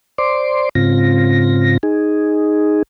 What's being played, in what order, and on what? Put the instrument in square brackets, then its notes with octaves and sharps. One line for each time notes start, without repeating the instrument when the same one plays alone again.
[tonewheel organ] C5 D5 C6 D6
G#2 C#3 C4 F4 A#6
D#4 G#4